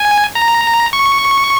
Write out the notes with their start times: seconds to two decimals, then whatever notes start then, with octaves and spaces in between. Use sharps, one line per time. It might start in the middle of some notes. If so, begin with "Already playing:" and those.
Already playing: G#5
0.35 A#5
0.93 C#6